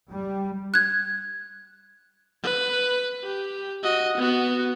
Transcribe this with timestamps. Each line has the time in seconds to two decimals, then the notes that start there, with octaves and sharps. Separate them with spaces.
0.12 G3
0.74 F#6 G#6
2.43 B4
3.24 G4
3.83 F#4 D#5
4.17 B3 F#4